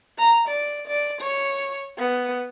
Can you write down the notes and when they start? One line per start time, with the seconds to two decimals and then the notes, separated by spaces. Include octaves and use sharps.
0.18 A#5
0.48 D5
0.87 D5
1.21 C#5
1.98 B3